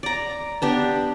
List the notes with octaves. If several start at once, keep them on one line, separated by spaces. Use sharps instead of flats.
D5 A#5
B3 D4 G4